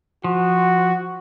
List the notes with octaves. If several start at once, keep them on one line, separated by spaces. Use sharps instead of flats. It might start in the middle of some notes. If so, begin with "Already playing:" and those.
F3 F#4